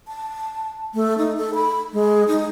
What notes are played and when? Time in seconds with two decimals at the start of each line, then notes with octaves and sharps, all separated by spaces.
0.08 A5
0.95 A3
1.18 D#4
1.37 A4
1.54 B5
1.94 G#3
2.28 D#4